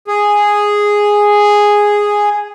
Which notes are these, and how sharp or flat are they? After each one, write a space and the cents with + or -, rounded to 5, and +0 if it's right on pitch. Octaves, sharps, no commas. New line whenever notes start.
G#4 -5